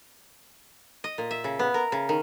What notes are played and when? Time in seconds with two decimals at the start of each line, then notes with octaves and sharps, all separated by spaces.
1.04 D#5
1.18 A#2
1.31 E5
1.44 C#3
1.59 B3
1.74 A#4
1.92 C#3
2.09 D#3